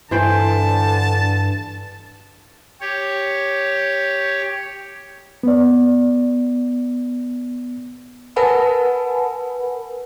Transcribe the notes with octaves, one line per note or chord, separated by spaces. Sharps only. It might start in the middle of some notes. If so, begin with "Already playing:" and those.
G2 D3 E3 C5 G5 A5
G4 C#5
B3 D5
A#4 B4 F#5 G#5 A5 B5